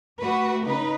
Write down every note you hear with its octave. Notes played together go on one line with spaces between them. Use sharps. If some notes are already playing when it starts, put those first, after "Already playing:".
A3 F#4 G4 B4
C#3 D#4 B4